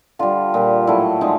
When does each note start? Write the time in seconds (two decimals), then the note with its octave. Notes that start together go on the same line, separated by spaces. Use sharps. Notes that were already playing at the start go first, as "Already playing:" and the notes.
0.19 D3 G3 F4
0.54 A#2 G3
0.87 A2 F#3 A3 E4
1.21 D3 F3 G#3 D#4